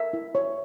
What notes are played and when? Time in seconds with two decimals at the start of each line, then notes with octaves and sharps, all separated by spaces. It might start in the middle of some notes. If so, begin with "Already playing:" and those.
Already playing: A#4 E5
0.13 E4
0.35 C#5